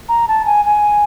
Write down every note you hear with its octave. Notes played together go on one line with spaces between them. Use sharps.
A#5
A5
G#5
G#5